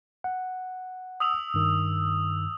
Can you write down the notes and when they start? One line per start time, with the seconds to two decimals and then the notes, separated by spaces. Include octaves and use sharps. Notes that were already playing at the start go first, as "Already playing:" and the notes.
0.24 F#5
1.20 D#6 E6 F7
1.54 G2 D#3